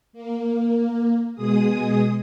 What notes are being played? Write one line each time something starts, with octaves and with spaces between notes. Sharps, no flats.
A#3
B2 G#3 G#4 D#6